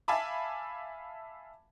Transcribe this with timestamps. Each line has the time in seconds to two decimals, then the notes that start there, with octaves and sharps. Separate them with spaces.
0.08 E5 F5 G#5 A5 B5 D6